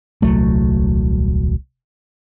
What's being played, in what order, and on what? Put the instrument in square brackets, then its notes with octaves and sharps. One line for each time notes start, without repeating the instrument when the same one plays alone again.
[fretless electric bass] D#1 C2 F#3 A3